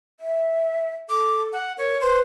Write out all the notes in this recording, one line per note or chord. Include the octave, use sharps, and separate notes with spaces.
E5
A4 D6
F#5
A#4 C#5
B4 C5